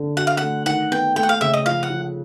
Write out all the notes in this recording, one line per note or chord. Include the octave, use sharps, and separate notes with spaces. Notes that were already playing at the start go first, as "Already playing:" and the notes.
Already playing: D3
F#4 F#5
F5
A3 F#5
D#3 F#5
B3 G5
A3 G5
F#5
F5
C#3 E5
D#5
F3 F5
F#5
F3